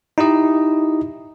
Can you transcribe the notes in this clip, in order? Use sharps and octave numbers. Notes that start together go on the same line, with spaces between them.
D#4 E4 G4 D#5